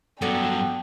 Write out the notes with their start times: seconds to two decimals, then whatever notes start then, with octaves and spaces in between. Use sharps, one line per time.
0.22 G2 F#3 B3 A4 D5 G5